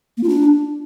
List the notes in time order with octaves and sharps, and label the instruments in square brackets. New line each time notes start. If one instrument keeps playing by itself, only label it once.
[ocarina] A#3
F4
D4